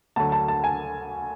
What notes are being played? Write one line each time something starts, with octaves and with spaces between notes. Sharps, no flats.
D2 D3 F#3 A5
A5
A5
G#5